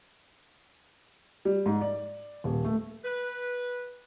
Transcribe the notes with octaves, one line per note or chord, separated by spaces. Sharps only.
G3
G#2
D5
D#1
A3
B4